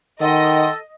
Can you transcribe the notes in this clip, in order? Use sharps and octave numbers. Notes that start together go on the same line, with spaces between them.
D#3 A4 D#5 F#5 G5 C6